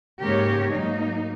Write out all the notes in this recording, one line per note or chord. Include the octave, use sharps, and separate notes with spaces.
G#2 C#3 A#3 G4 A#4 C#5
G#2 F#3 A#3 D#4